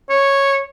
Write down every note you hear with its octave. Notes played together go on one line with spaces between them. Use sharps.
C#5